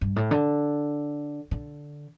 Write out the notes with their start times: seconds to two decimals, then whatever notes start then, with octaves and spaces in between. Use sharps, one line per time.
0.01 G2
0.16 A2
0.31 D3
1.51 D3